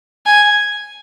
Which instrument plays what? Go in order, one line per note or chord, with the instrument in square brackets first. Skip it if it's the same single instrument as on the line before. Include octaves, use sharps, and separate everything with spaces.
[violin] G#5